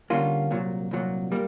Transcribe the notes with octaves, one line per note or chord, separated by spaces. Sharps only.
D3 G3 A#3 C#4 F4
C2 A#2 F#3
C2 A#2 F#3
G3 A#3